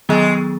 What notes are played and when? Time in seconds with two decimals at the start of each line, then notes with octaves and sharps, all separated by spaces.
0.09 D#3 F#3 G#3 B3